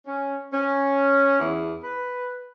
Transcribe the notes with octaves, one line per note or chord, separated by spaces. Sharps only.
C#4
C#4
E2
B4